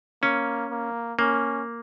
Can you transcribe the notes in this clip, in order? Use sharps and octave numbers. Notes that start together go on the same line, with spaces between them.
A#3 C#4
A#3
A#3 C#4